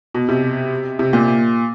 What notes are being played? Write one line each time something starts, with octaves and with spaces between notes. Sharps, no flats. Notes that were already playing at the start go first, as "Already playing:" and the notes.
B2
C3
C3
A#2